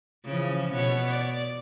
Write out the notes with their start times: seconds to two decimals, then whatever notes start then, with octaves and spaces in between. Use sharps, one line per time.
0.25 C#3 E3 F3
0.73 B2 B3 C#5
1.07 D5